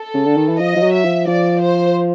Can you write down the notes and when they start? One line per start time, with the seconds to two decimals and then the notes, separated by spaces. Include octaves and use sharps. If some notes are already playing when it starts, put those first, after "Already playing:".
Already playing: A4
0.14 C#3
0.26 D3
0.37 D#3
0.48 E3
0.60 F3 D#5
0.76 F3
0.83 F#3
0.93 E5
1.05 F3
1.27 F3 D5
1.61 C5